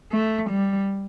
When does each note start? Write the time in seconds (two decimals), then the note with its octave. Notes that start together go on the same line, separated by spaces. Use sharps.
0.12 A3
0.51 G3